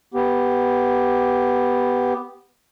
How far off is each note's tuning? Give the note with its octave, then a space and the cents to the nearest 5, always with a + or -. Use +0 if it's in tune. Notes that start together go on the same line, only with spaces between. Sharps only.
B3 +0 G4 +0